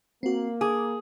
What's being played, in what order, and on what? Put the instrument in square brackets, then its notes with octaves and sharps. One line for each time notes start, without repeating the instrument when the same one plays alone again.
[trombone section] A#3 [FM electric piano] C4 F#4
[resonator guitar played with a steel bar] G#4 [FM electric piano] D6